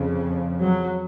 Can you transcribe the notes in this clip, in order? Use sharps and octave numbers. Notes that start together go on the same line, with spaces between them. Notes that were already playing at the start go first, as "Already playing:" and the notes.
Already playing: F2 C#3
F#3